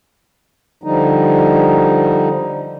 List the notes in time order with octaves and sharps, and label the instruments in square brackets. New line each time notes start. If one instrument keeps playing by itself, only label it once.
[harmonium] D3 F3 G3 D#4